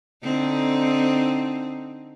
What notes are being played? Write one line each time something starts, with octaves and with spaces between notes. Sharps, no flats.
D3 C4 D#4